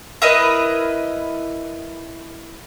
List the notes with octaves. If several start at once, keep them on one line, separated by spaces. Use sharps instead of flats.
E4 A#4 B4 D#5